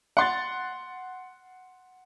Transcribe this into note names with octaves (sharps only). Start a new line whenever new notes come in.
F#5 C6 A6